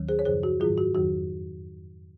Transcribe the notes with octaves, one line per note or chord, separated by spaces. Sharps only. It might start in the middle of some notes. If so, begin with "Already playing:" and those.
Already playing: D#2 D#3 F#3
G#4 C5
C#5
F#2 C#3 F3 G#4 C5
F#4
G#2 D#3 F#3 F4 G#4
F#4
F2 D#3 F#3 F#4